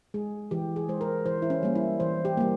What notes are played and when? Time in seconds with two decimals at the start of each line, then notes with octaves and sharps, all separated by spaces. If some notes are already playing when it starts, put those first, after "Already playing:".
0.14 G#3 G#4
0.51 E3 G4
0.76 G#4
0.89 G#3 C5
1.01 A#4
1.26 E3 C5
1.42 E4
1.50 C#4
1.63 G3 A#3
1.75 E4
2.00 E3 C5
2.25 G4
2.37 G3 A#3